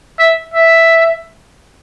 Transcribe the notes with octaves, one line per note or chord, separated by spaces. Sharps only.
E5
E5